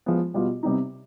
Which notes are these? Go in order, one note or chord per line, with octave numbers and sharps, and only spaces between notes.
F3 G#3 B3
B2 G3 B3 F4
C3 G3 B3 D#4